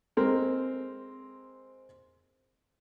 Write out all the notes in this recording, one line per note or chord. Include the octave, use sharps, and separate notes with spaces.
G#3 C4 A#4